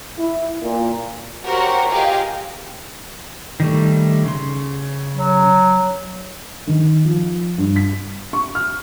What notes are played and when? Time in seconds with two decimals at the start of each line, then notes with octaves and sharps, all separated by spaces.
0.18 E4
0.63 A#2
1.44 F#4 G4 A#4 C5 C#5 F#5
1.88 F4 G4 G#4 A#4 D#5 F5
3.60 D#3 G3 A3
4.25 C#3 C6
5.15 F#3
6.67 D#3
7.05 F3
7.58 G2
7.76 B6
8.33 C#6
8.55 F6